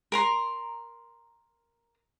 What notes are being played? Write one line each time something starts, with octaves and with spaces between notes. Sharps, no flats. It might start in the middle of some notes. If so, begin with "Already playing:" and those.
A#4 A#5 C6